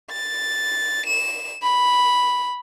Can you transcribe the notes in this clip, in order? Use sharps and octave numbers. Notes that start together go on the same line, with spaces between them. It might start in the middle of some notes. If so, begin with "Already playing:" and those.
A6
E7
B5